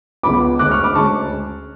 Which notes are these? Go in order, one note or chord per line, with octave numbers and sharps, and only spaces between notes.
C#2 C#3 G#3 B3 F4 B5 D6
D2 C#3 G#3 C#4 D6 F#6
C#6 F6
B5 D6
D2 C#3 G#3 C#4 A5 C#6